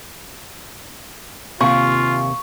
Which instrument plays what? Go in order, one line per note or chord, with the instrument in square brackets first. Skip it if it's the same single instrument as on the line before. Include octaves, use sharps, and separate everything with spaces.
[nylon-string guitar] D#2 C3 [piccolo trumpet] F4 [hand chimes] F5 G#5 [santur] C#6